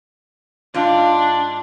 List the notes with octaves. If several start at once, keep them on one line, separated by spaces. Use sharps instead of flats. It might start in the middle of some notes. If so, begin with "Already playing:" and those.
G#2 D4 F4